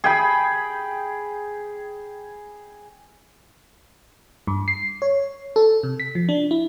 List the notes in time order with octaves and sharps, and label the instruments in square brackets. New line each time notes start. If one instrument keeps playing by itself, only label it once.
[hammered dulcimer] G#4 G5 B5
[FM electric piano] G2
C7
C#5
A4
C3
B6
F3
D4
E4